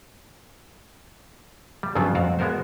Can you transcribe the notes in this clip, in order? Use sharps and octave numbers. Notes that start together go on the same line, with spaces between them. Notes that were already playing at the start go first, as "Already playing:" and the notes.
G3
G2 C#3 F3 F#3 B3 F4
F2 F#4 D5 F5
G#3 B3 F#4 A#4 C5